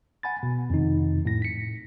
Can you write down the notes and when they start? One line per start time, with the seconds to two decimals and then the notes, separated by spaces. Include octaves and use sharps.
0.23 F#5 G#5 B5 A6
0.43 B2
0.70 F2 C3 D#3 D#4
1.25 A2 A#6
1.42 B6 C#7